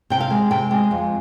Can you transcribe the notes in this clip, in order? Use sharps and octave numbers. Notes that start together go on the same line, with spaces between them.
C3 G5
F5
G#3
C3 G5
G#3
F2